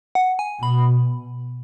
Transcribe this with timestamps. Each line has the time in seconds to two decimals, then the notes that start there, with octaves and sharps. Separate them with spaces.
0.15 F#5
0.39 G#5
0.63 B2 B5